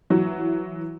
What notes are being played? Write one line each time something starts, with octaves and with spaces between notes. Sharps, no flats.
E3 F#3 F#4